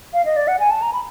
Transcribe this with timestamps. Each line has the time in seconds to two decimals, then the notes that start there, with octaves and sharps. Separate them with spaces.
0.14 F5
0.25 D#5
0.36 D5
0.48 F#5
0.60 G#5
0.71 A5
0.82 A#5
0.93 B5